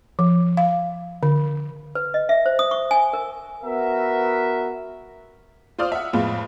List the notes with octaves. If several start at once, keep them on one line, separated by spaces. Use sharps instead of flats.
F3
F5
D3
B4
D#5
E5
C5
D#6
C#6
G#5
A#4
B3 F#4 A#4 E5
F4 C5 D5 D#6 F6
E5 F#5
F2 A2 G#3 B3 F4